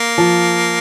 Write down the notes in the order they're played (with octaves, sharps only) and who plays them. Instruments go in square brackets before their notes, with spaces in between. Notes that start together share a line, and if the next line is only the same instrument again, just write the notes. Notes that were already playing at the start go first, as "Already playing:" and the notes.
Already playing: [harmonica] A#3
[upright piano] F3